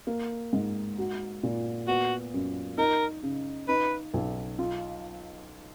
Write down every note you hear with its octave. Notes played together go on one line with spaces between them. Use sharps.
A#3
G#2
F#4
A#2
B3 F#4
F#2
D#4 A#4
C#3
D#4 B4
B1
F4